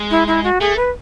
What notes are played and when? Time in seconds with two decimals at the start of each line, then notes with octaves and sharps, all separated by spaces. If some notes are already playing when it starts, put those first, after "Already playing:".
Already playing: G#3
0.11 E4
0.27 E4
0.44 F#4
0.60 A3 G#4
0.77 B4